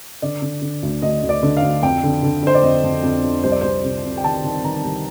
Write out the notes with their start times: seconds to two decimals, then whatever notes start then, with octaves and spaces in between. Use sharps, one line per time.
0.22 D3 D5
0.42 D3
0.62 D3
0.83 D2
1.02 D2 D#5
1.23 D2
1.29 D5
1.43 D3
1.57 F5
1.62 D2
1.83 F2 G5
2.03 D3
2.23 D3
2.43 D3 C5
2.55 D5
2.63 F2 D#5
2.84 F2
3.03 F2
3.24 F2
3.44 C2 C5
3.52 D5
3.61 C2 C5
3.84 C3
4.04 C3
4.17 G5
4.24 D#3 A5
4.44 D#3
4.64 D#3 A#5
4.85 C2